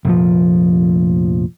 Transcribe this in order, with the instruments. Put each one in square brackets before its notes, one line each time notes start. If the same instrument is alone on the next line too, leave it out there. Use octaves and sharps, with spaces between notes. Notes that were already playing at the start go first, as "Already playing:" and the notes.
[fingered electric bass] F1 A#1 F3